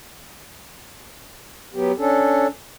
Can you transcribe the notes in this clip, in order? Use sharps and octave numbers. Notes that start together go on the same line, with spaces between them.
F#3 B3 G4
C#4 D4 A4